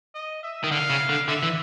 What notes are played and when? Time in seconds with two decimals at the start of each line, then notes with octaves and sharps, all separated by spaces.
0.15 D#5
0.43 E5
0.64 D#3
0.71 D3 F5
0.90 C#3
1.10 D3
1.28 D3 E5
1.43 E3